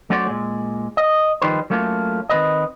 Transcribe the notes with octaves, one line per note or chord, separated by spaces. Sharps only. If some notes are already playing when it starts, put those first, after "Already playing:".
F#3 A3 C#4 F#4 C5 D5
A#2 G#3
D#5
D#3 F3 G3 D#4 B4 C5
F#3 A3 A#3 C#4 F4 A4
D#3 C4 B4 D#5